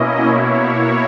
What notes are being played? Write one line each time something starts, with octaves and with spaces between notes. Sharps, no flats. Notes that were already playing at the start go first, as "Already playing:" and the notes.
Already playing: B2 A#3 C#4 E4 D#5
B2 A#3 E4 C#5